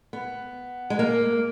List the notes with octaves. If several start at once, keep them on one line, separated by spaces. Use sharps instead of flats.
B3
G#3
A#3